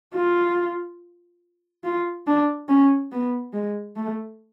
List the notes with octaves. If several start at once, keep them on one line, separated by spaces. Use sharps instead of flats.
F4
F4
D4
C#4
B3
G#3
A3